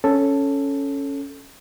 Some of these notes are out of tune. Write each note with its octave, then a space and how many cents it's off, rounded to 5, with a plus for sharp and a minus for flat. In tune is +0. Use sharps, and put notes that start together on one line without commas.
C#4 +0 A4 +0